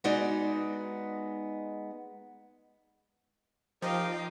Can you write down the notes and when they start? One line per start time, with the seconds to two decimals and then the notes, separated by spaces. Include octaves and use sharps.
0.04 G#3 B3 D#4 F#4 D5
3.82 F3 D#4 G4 A#4 D#5 F5 G5